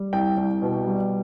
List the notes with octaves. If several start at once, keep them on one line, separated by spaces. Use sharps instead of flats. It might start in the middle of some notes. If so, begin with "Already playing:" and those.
Already playing: G3
C2 G5
C2
B2
G3